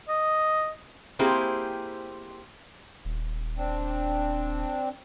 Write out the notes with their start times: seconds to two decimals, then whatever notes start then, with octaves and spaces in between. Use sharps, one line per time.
0.09 D#5
1.19 A#3 C4 E4 G4 G#4 C5
3.05 D#1
3.57 C4 D4